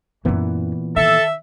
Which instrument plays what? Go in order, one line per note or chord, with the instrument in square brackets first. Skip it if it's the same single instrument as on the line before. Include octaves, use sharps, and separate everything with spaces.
[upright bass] F#2 E4 [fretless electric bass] A#2 E3 B3
[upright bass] D#3 [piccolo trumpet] A4 [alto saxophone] E5